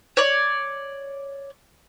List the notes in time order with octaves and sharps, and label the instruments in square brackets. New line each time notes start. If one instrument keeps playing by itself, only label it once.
[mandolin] C#5 D5